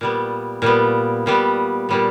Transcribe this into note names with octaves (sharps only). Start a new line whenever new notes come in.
A#2 G3 B3
A#2 G3 B3
A#2 G3 B3
A#2 G3 B3